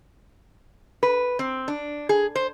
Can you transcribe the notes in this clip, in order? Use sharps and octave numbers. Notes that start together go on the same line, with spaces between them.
B4
C4
D4
G#4
C5